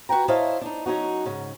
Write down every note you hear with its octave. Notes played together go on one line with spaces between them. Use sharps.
F#4 B4 G5 A#5
E4 C5 C#5 D#5 F5 A5
D4 D#4
F#3 C#4 D#4 F#4
G#2 C#3